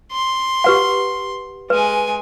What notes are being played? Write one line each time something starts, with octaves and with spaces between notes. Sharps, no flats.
C6
G4 B4 F#5
G#3 B4 G#5